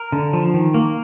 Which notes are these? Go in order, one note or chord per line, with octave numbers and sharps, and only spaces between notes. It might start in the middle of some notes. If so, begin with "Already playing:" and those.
Already playing: A#4
D3
F3
D#3
A#3